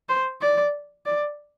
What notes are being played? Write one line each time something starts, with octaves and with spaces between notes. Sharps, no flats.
C5
D5
D5